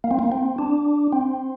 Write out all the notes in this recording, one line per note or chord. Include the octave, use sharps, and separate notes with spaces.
A#3
C4
A#3
C4
D4
C4